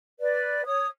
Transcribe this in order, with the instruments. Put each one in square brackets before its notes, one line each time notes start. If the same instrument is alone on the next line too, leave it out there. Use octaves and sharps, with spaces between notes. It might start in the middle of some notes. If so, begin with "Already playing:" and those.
[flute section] B4 D5
C#5 D#6